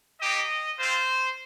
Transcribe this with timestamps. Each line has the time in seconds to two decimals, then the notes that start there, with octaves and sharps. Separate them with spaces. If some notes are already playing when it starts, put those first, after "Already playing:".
0.20 A#3 D#4 G4 D#5
0.79 C4 F4 C5